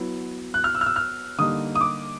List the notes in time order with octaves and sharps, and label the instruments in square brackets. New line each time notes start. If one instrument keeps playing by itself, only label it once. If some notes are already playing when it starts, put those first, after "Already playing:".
Already playing: [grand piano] F#3 B3 E4
F#6
F6
E6
F6
E6
F6
D3 G3 A#3 D#4 D#6
D#6
D6